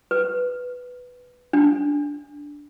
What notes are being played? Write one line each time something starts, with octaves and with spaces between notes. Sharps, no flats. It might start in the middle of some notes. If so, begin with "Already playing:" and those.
B4
D4